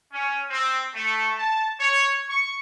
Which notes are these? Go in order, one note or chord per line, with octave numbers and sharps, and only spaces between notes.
C#4
C4
A3
A5
C#5
C#6